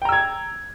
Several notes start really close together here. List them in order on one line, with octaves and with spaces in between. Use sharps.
G5 A#5 E6 G#6